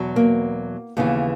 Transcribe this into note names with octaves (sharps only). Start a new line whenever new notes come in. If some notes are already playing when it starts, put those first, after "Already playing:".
Already playing: E2 B2 F#3
A#3
D#2 C#3 E3 B3